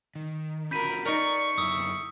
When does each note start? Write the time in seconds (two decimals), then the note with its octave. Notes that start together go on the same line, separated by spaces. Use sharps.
0.15 D#3
0.71 C#4 F4 F#4 A#4 B5 G6 B6 D#7
1.06 D#4 A#4 D5 C#6
1.58 F#2 E4 D#6 E6